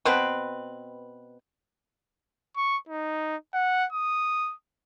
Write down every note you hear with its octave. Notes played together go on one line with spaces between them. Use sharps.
B2 C4 B4
C#6
D#4
F#5
D#6